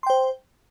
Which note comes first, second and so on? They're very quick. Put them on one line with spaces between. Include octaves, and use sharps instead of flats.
C6 G5 C5